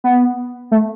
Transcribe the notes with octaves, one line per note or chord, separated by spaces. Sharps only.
B3
A3